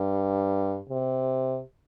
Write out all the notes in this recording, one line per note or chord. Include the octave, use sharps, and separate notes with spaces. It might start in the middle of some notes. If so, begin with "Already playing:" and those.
Already playing: G2
C3